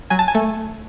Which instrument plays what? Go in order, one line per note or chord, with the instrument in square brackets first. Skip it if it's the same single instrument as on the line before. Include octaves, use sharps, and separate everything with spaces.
[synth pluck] F#3 G#5
A5
G#5
A3